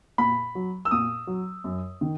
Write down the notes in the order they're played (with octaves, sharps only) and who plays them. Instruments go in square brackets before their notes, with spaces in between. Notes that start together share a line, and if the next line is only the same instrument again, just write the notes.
[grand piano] A#2 B5
F#3
E6
A#2 D#6
F#3
F#2
D#3